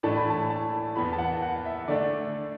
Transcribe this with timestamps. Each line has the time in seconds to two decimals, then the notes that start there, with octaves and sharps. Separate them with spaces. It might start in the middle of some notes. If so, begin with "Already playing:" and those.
0.03 A2 E3 A3 D4 A5
0.17 B5
0.30 A5
0.50 A5
0.95 E2 E3 B3 B5
1.13 A5
1.19 F#5
1.42 F#5
1.65 E5
1.88 D3 A3 D4 D5